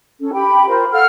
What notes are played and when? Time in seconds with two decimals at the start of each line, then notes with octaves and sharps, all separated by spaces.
0.20 C#4 A4
0.32 G4 G5 B5
0.67 F4 A#4 C5
0.91 A4 F5 F#5 F6